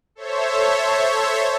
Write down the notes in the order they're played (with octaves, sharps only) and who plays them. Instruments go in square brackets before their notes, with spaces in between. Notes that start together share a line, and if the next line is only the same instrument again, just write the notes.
[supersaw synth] A4 C5 C#5 E5